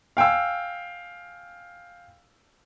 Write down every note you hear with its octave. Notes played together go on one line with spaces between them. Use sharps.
F5 G5 G#5 E6